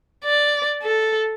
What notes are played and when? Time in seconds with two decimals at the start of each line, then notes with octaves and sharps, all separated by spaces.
0.24 D5
0.83 A4